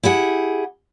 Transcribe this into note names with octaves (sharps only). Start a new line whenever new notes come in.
E4 G4 G#4 F#5